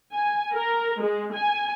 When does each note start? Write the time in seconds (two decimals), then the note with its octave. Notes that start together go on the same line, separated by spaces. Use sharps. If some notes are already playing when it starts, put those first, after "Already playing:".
0.13 G#5
0.53 A#4
1.02 G#3
1.34 G#5